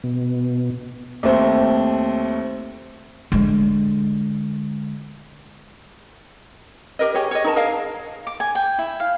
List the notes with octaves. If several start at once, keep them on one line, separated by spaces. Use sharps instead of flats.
B2
D#2 A3 C4
D3 G#3
G4 A#4 D#5
G4 G#4 C#5
C#5 D#5
D#4 A#4 A5
G#4 A#4 D#5 F5
D6
G#5
G5
E4
F5